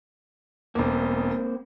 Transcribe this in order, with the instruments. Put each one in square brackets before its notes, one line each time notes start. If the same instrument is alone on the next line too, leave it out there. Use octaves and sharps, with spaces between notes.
[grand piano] E1 E2 [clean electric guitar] A#3 C4